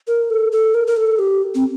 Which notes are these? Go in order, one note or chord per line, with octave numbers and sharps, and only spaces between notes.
A#4
A4
A4
A#4
A#4
A4
G4
C4